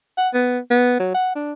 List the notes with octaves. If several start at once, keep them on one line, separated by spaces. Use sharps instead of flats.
F#5
B3
B3
F#3
F#5
D4